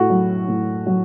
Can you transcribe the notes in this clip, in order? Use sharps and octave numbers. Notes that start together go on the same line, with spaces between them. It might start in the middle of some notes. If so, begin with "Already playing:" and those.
Already playing: A2 F#4 A4
F#3
A2
F#3